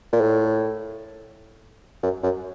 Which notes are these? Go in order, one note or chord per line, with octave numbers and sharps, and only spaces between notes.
A#2
A2
F#2
F#2